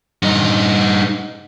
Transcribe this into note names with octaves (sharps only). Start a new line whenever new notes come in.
G2 D#4